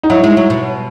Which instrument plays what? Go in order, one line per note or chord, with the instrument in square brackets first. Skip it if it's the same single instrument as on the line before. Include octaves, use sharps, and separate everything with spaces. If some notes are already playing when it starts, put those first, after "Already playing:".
[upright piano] D#4
[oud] F#3 [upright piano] E4
[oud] G#3
F#3
B2